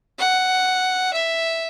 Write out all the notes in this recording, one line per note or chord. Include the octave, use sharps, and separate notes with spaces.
F#5
E5